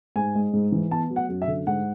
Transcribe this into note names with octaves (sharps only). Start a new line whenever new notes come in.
G#2 G#5
G#3
G#2
E3
B3 A5
F#3
F#5
F#2
E5
D3
G#2 F#5